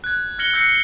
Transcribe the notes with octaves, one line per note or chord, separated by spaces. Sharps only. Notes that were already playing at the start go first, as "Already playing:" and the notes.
F#6 G#6
F6 G#6 A#6 C#7 F#7 G7
E6 F#6 G6 A#6 C7 C#7